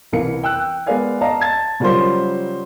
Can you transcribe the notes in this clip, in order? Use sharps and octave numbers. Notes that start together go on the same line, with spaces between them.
C2 E3 A#4 F5 C#7
G5 E6 F#6
G#3 B3 A#4 D5 F5 G#5
D5 D#5 F5 A5 A#5
A5 G#6 A6
C#3 F#3 G3 F4 A#4 C5